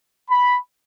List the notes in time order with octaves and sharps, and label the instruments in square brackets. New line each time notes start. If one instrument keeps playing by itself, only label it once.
[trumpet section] B5